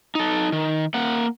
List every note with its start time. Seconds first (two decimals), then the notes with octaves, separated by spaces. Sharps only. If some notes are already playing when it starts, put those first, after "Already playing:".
0.15 D#4 A4
0.52 D#3
0.94 A#3 F#5